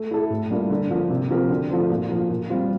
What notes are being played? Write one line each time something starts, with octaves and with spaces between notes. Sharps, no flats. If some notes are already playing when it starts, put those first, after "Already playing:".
Already playing: A3
E4 A4
A2
G3 A#3 D4 F4
D3
F3 A#3
C3
F3 C4 G4 A#4
D3
F3 A3 C4
A#2
F3 A#3
A#2
G3 C4 F4